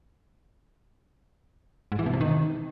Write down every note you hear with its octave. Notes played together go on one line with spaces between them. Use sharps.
G#2
E3
B2
C3
D#3